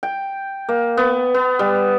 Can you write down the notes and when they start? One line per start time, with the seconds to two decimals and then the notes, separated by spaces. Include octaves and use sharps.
0.03 G5
0.69 A#3
0.97 B3
1.34 B3
1.59 G3